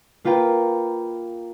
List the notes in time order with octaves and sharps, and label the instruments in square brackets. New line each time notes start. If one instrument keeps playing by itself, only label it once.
[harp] A#3 F4 B4 G5 A#5